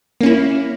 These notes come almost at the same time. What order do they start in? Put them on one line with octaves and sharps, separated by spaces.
A#3 C#4 E4